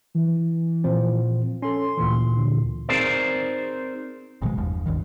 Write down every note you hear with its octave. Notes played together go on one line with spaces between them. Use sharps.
E3
A#2 F3 C4
C#4 A4 C6
D2 A#2 E3
D3
C4 D#4 G#4 A#4 C5 D5
G#1 B2 F3 G#3
G1 E2 F3
E1 C#2 G2 D#3